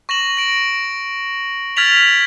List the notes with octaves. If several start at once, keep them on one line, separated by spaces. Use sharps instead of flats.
C#6 A#6 E7 F#7
A#6 D7
F6 G#6 A6 B6 F7 F#7